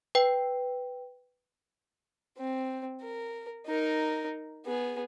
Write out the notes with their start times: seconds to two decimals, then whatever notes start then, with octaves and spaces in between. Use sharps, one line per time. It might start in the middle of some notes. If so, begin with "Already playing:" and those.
0.15 B4 G5
2.38 C4
3.01 A#4
3.67 D#4 A#4
4.66 B3 G#4